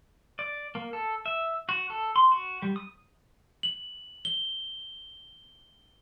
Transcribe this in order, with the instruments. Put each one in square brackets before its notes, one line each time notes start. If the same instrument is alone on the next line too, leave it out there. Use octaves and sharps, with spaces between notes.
[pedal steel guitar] D5
A#3
A4
E5
F#4
A4
C6
F#4
G3
D#6
[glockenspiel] F#7
G7